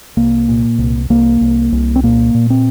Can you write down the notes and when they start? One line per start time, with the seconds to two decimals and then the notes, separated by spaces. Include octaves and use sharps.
0.17 C2 A#3
0.48 A#2
0.78 C2
1.10 C2 A#3
1.41 C2
1.72 C2
1.96 C4
2.03 A#2 A#3
2.34 A#2
2.50 C4